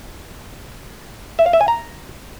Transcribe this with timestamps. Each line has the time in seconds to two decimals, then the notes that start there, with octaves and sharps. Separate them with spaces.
1.39 E5
1.46 F5
1.53 E5
1.61 G#5
1.68 A#5